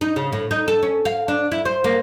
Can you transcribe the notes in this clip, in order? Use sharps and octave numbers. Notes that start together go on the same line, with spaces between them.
D#4
C#3
A2
D#4
A4
C#4
F5
D4
E4
C5
A#3